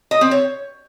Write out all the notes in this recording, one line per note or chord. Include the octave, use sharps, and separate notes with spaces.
D#5
C4
C#5